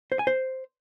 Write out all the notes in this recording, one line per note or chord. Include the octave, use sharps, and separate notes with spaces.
C5
G#5
C5